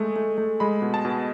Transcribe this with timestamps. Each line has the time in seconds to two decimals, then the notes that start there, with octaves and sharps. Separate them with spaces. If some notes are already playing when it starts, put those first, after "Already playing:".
Already playing: G#3 A3
0.16 A3
0.38 A3
0.60 G#3 B5
0.82 B2
0.94 A5
1.05 B2